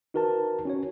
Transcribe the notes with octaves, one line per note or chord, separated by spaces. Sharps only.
D#4 F#4 A#4 B4 A5
C#4 F#4 C#5